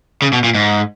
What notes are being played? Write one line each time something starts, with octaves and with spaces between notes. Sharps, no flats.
C#3
B2
A#2
G#2